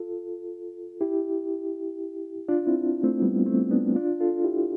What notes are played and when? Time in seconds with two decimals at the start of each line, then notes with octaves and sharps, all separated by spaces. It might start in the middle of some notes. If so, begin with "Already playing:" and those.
Already playing: F4 A4
1.01 E4 G4
2.48 D4 F4
2.66 C4 E4
3.03 A3 C4
3.22 G3 B3
3.46 A3 C4
3.71 B3 D4
3.95 D4 F4
4.20 F4 A4
4.44 E4 G4